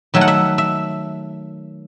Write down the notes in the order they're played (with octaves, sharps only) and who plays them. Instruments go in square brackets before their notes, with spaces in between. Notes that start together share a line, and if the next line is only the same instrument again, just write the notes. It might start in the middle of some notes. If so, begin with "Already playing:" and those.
[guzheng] D#3 F#3 A3 E5
F#5
E5
E5